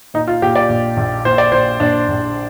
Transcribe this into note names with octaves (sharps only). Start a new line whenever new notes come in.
A#2 D#4
F4
A#2 G4
D5
A#1
A#1
A#2 C5
D5
A#2 C5
A#1 D4
A#1